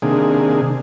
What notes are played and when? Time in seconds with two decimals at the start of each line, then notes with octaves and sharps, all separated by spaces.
0.02 C3 D#3 A#3 D4 G#4